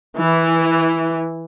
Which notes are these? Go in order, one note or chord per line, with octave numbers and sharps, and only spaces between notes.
E3